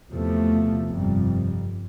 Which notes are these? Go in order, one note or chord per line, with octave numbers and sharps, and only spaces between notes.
E2 C3 F3 A3
G1 F2 C3 G3